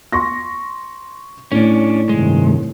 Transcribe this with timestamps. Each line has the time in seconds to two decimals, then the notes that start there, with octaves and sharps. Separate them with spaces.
0.12 C6 C#6 A#6
1.52 A2 C#4 D4
2.09 G2 C3 D#3 G#3